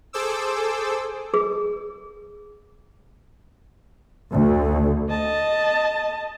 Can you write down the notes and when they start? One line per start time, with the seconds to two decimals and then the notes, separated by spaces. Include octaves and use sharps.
0.13 G#4 A4 C5 D6 E6
1.34 G#4
4.32 D2
5.10 D#5 A5